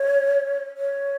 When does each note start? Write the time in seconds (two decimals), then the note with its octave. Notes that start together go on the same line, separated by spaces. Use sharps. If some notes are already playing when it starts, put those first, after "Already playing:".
Already playing: C#5
0.77 C#5